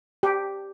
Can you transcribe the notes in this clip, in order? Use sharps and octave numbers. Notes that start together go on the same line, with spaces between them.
G4